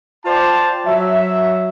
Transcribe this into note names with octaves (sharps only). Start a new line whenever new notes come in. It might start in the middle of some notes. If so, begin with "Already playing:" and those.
F4 C5 D5 G5 A5
F#3 E5